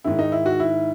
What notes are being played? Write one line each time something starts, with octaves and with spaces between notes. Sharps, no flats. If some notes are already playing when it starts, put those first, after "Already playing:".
G#2 D#3 E4
D#4
E4
F#4
E4